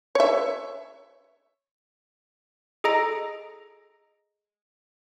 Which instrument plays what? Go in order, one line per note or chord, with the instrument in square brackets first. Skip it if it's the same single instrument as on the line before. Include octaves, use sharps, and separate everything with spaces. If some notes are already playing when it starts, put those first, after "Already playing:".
[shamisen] C#5 E5
[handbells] G#4 A4 D#5 A#5 A#6 D7